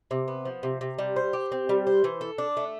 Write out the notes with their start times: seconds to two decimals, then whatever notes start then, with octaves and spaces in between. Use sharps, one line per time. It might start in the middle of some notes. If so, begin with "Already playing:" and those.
0.11 C3
0.28 B3
0.45 F3
0.63 C3
0.81 C3
0.99 G3
1.16 C5
1.33 G4
1.52 C4
1.69 G3
1.87 C5
2.04 E3
2.21 A4
2.38 D4
2.57 A3